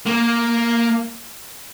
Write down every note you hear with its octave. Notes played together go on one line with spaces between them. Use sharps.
A#3